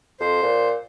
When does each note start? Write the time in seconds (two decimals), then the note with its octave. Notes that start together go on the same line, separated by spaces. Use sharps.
0.20 F2 C5
0.43 A#2